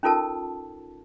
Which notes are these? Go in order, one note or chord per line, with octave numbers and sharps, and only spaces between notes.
C#4 D#4 F4 A4 A#4 A5